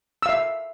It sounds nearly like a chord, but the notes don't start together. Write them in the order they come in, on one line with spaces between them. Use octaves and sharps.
E6 F5 E5